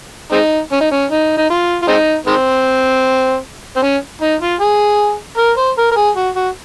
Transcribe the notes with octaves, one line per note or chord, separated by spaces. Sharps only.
G#3 C4 D#4
C#4
D#4
C#4
D#4
D#4
F4
F4
G#3 C4 D#4
D#3 G#3 C4
C4
C#4
D#4
F4
G#4
A#4
C5
A#4
A#4
G#4
F#4
F#4